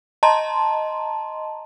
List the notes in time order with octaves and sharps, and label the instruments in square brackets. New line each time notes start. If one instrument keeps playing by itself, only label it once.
[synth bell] D#5 A5 A#5 C6